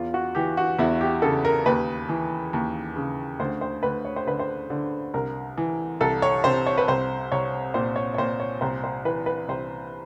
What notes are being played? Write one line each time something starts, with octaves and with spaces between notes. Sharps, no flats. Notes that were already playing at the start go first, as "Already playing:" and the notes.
Already playing: E2 F4
F#4
E3 G4
F#4
E2 E4
G4
C#3 A4
A#4
D#2 B4
E3
D#2
C#3
D2 C5
C5
D2 B4
C#5
C5
D3 B4
C5
D3
C2 A#4
E3
C2 A4
C#5
C3 C5
C#5
B4
C2 C5
C2 C#5
A#2 C5
C#5
C#5
A#2 C5
C#5
C2 C5
C5
E3 B4
B4
C2 C5